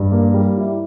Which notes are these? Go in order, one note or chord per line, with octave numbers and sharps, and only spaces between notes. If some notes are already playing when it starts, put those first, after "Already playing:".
Already playing: G2
A#3
G3
E4